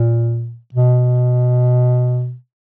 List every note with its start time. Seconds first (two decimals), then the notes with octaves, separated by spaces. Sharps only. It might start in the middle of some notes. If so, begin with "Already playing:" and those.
Already playing: A#2
0.74 B2